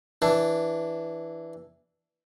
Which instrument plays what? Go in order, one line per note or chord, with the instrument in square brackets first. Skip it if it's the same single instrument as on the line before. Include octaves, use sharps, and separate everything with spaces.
[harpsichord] E3 D4